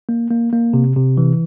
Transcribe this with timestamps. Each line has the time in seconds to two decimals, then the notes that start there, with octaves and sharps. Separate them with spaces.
0.09 A#3
0.31 A#3
0.53 A#3
0.73 C3
0.96 C3
1.17 E3